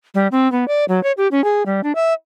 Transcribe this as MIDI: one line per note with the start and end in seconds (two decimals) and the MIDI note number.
0.14 0.27 55
0.32 0.50 60
0.52 0.67 59
0.68 0.85 74
0.88 1.02 54
1.03 1.12 73
1.17 1.28 67
1.31 1.43 61
1.44 1.63 68
1.66 1.81 55
1.83 1.92 62
1.95 2.13 76